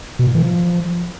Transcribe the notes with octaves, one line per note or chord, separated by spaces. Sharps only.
B2
A#2
E3
F3